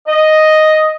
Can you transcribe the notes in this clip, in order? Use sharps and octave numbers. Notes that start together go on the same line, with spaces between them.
D#5